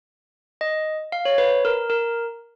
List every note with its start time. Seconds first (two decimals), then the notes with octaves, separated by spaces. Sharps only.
0.61 D#5
1.12 F5
1.25 C#5
1.38 B4
1.65 A#4
1.90 A#4